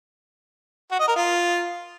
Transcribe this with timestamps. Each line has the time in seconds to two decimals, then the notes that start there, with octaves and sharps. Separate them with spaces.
0.91 F#4
0.99 D#5
1.08 A#4
1.16 F4